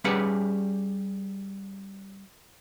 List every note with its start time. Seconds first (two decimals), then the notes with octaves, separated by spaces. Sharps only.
0.04 G3 C#4 G4 G#4 B4 F#5